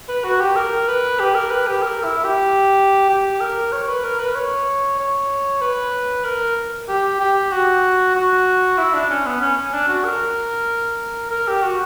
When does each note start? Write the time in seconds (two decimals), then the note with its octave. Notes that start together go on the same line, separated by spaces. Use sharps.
0.09 B4
0.24 F#4
0.40 G4
0.56 A#4
0.88 B4
1.20 G4
1.35 A#4
1.51 B4
1.67 G4
1.82 A#4
2.04 E4
2.24 G4
3.09 G4
3.41 A#4
3.73 C#5
3.89 B4
4.04 A#4
4.19 B4
4.35 C#5
4.99 C#5
5.61 B4
6.25 A#4
6.88 G4
7.20 G4
7.52 F#4
8.15 F#4
8.78 E4
8.93 D4
9.10 C#4
9.25 B3
9.41 C#4
9.57 C#4
9.73 D4
9.88 F#4
10.04 A#4
11.31 A#4
11.47 G4
11.63 F#4